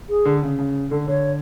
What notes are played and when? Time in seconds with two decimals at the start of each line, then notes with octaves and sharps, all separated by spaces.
0.10 G#4
0.25 D3
0.43 C#3
0.59 C#3
0.91 D3 A4
1.08 D3 C#5